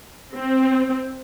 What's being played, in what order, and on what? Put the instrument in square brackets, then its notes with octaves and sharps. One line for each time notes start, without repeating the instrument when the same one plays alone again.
[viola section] C4